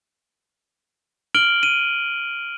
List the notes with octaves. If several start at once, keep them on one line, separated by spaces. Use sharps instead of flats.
F6 D7 F#7 G7
D#7